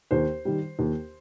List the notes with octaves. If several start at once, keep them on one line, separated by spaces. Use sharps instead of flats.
D#2 C5
D#3 G3
D#2